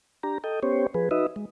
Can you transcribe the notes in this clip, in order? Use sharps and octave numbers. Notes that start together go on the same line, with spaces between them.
D4 G4 A#5
A4 D#5 G5
B3 C#4 G4 C5 C#5
F3 G#4 B4
D#4 F#4 B4 D#5 E5
G#3